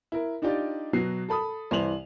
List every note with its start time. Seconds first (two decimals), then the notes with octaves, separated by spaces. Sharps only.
0.12 E4 A#4
0.42 D4 D#4 F4 G4 D5
0.93 B2 F#3 F#4 C7
1.29 A4 A5 B5 D#6
1.71 C2 E3 E4 C5 F7 F#7